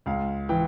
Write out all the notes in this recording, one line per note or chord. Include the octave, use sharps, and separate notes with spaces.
C#2 F5
E3 G5